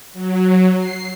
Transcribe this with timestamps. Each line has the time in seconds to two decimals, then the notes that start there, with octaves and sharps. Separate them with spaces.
0.13 F#3
0.76 C7